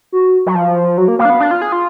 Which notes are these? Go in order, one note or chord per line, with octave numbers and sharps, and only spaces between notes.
F#4
F#3
F3
F#3 F#4
A#3
A#3 F5
D4
B3
D4
F4
G#4
F4